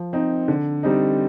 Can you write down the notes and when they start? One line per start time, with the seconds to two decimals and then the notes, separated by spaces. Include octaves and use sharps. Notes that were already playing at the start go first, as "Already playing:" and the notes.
Already playing: F3
0.13 C4 D#4
0.48 D3
0.83 G3 C4 D#4